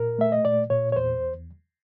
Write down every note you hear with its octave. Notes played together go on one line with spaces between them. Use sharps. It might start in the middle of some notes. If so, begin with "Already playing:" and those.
Already playing: A#2 A#4
A3 E5
D#5
A#2 D5
A#2 C#5
C#5
E2 C5